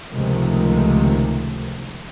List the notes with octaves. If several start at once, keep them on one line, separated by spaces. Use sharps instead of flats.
C#2 C3 D#3 F3 G#3 A3